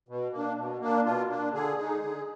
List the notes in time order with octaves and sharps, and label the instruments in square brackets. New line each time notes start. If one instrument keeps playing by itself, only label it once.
[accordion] B2
A#3 D4
B2
A#3 D4
B2 F4
A#3 D4
D3 G#4
G#3 D#4
D3